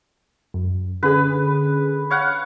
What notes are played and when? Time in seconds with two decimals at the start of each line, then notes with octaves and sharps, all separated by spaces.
0.54 F#2
1.03 D3 C#4 G#4 B4
2.11 C#5 F5 F#5